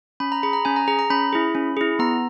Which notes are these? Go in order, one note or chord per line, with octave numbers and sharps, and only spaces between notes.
C#4 B5
A#5
G#4 B5
A#5
C#4 G#5
A#5
G#4 A#5
A#5
C#4 B5
E4 G#4
C#4
E4 G#4
B3 A#5